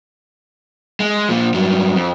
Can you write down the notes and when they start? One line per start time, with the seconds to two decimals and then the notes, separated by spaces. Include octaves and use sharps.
1.00 G#3
1.29 A#2 F3
1.54 G2 F#3
1.96 F2